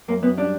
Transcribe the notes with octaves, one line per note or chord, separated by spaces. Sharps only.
F#2 A#3
F#2 B3
G3 D4